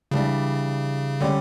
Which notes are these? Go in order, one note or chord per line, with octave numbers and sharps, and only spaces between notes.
C#3 E3 G3 D4
D3 G3 C#4 G4 D5